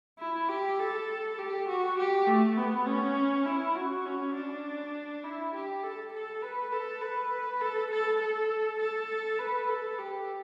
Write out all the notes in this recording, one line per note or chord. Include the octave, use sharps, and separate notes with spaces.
E4
G4
A4
G4
F#4
G4
A3
B3
C#4
E4
F#4
C#4
D4
E4
G4
A4
A4
B4
A4
B4
A4
A4
A4
A4
B4
A4
G4